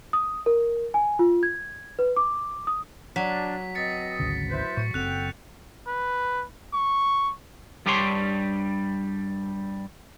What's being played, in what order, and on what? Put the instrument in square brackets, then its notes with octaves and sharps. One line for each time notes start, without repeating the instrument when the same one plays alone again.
[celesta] D#6
A#4
G#5
F4
G#6
B4
D6
D#6
[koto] F#3 [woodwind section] D4 [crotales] B6
[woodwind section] B2 C4 D#5 [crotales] A6 B6 C#7
[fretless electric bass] G#1 D2 C#3
[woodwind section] E4 B4 C5
[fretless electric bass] A2 [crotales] C#6 C#7
[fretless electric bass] F#1 C4 [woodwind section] F#4 A4 G5 [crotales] F#6 F7
[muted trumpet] B4
C#6
[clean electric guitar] G2 G3 D4 G4 C#5 C6